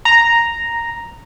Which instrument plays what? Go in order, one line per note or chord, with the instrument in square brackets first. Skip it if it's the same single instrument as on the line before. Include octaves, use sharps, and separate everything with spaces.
[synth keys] A#5